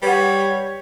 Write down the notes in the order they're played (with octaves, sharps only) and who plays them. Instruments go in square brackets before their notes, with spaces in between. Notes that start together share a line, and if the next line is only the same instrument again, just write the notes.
[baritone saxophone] G3 [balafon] B4 F#5 [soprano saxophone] C#5